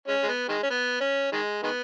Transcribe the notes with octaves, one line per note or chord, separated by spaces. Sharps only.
G#3 C#4
G#3
B3
D#3 G#3
C#4
B3
C#4
D#3 G#3
D#3 G#3 B3